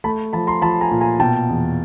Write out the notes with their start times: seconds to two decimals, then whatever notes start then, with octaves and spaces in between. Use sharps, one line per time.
0.04 A3 A5 B5
0.33 F3 A5 B5
0.47 A#5 C6
0.62 F3 A5 B5
0.81 G#5 A#5
0.91 A#2
1.01 G#5 A#5
1.19 B2 G5 A5
1.49 E2